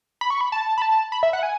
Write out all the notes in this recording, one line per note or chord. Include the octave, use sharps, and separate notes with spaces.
B5
C#6
B5
A5
B5
A5
B5
E5
F#5
G#5